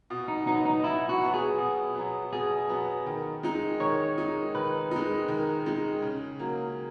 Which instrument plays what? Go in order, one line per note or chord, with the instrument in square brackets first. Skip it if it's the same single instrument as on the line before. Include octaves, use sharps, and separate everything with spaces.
[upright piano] B2
[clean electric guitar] D#4
[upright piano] F#3 B3 [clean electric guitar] D#4
[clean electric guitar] D#4
[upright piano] B2 [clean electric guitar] E4
[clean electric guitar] F#4
[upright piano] F#3 B3
[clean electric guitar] G#4
[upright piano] B2
F#3 B3
[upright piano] B2 [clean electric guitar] G#4
[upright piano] F#3 B3
D#3
G#3 D#4
[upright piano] D#3 [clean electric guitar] C#5
[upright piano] G#3 D#4
[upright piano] D#3 [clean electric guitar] B4
[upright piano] G#3 D#4
D#3
G#3 D#4
C#3
F#3 A#3